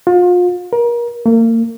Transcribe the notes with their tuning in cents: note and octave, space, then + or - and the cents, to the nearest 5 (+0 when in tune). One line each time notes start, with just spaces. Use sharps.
F4 +35
A#4 +30
A#3 -35